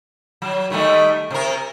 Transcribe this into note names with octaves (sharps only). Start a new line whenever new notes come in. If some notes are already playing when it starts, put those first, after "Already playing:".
F#3
D#3 G3 A3
C3 A#4